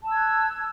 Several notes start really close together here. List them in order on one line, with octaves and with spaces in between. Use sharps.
A5 E6 G#6 F#6